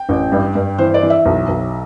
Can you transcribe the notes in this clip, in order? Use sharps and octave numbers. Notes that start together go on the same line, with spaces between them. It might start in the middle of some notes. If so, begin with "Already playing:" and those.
Already playing: G5
A1
G2
G2
E3 C5
D5
E3
E5
B1
B1